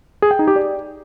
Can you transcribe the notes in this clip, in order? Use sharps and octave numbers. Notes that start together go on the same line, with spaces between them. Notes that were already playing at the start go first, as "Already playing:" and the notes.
G#4
G5
D#4
G4
D5